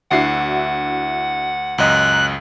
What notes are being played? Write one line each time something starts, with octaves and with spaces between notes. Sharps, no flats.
D2 D4 E4 F#4 F#5 C7
C#2 F#2 D#5 A#5 F#6